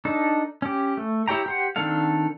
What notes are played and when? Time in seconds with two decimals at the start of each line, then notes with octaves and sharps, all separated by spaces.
0.05 D4 D#4 A4
0.62 C#4 G4
0.97 A3
1.28 E4 G4 C#5 G5 A#5
1.46 G4 C5 F#5
1.76 D#3 C4 D4 A4 F5